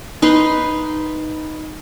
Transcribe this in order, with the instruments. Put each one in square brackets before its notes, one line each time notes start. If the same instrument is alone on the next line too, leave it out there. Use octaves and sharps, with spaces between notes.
[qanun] D#4 B4 B5 C6